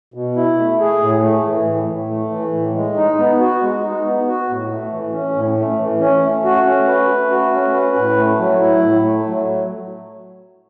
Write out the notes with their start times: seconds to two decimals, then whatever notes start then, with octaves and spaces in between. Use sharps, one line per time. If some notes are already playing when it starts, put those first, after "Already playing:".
0.14 B2
0.37 E4
0.58 A3
0.80 G#4
1.01 A2
1.22 A3
1.45 E3
1.66 A2
1.88 A2
2.10 A3
2.31 E3
2.53 A2
2.75 G#3
2.96 D#4
3.19 B3
3.40 F#4
3.61 G#3
3.84 D#4
4.06 B3
4.27 F#4
4.49 A2
4.71 A3
4.92 E3
5.13 C#4
5.35 A2
5.57 A3
5.79 E3
6.00 C#4
6.23 A3
6.44 F#4
6.66 C#4
6.87 B4
7.09 A3
7.30 F#4
7.52 C#4
7.73 B4
7.96 A2
8.17 A3
8.39 F#3
8.60 E4
8.82 A2
9.04 A3
9.26 F#3